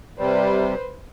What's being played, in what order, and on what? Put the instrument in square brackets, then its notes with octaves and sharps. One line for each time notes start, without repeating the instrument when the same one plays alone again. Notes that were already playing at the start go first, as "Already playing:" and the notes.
[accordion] C3 G3 [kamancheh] B4 C5